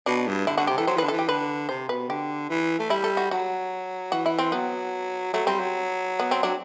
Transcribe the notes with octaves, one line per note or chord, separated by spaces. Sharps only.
B2 D4
G2
D3 E4
D3 F#4
C3 G4
E3 A4
F#3 C5
E3 B4
D3
E3 A4
G4
D3 B4
C3 C5
B2 B4
D3 G4
E3
A3
G3 E4
A4
F#4
F#3 F#4
E3 F#4
E4
C4
F#3 B3
F#3 A3
G3 C4
F#3
B3
C4
F#3 D4